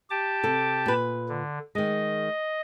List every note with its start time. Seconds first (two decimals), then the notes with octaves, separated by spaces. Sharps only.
0.10 G4 A5 D6
0.43 C3 A4
0.86 A#2 B4
1.29 D3
1.75 D#3 G#3 D#5